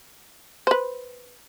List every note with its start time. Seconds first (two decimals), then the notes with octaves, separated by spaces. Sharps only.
0.67 B4 C5